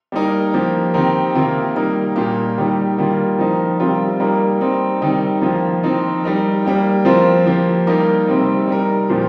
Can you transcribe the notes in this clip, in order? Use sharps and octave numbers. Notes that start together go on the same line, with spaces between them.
G3 A#3 D#4 A#4
F3 A#3 G4
D#3 C4 D#4 G4 A#4
C3 D#3 A#3 F4 A#4
G3 A#3 D#4 A#4
A#2 G3 A#3 G4
D#3 G3 D#4 G4
D#3 G3 A#3 F4
F3 D#4 A#4
C3 G3 C4 F4 A#4
G3 A#3 D#4 A#4
G3 C4 D#4
C3 D#3 G3 D#4
F3 A#3 F4
F3 C4 D#4
G3 D#4 A#4
G3 A#3 G4
F3 C4 F4 A#4
F3 A#3 G4
G3 A#3 D#4 G4 A#4
C3 G3 C4 D#4
G3 D#4 A#4
A#2 F3 A#3 G4